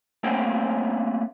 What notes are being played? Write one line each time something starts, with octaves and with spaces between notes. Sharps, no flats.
A3 A#3 C4 C#4 F#5 G5